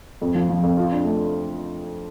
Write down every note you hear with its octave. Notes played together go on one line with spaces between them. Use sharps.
F2
F3
F3
F2
F4
D4
A3